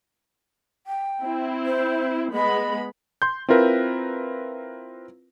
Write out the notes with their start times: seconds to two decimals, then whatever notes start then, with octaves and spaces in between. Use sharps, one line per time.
0.87 G5
1.22 C4 E4
1.66 C5
2.34 G#3 B3 D#5 B5
3.22 C6 G6
3.49 C4 E4 F4 A#4 B4